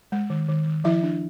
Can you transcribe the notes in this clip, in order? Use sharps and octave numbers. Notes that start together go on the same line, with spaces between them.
G#3
D#3
D#3
D#3
F3 E4 E5
D4